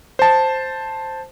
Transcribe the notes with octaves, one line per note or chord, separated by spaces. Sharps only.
C5 A5